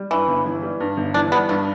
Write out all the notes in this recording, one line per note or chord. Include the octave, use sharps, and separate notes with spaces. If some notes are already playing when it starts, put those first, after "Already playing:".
Already playing: G3
G2 E3
G1
E3
G3
G2
G1
E3 D4
G3 B3
G2 A3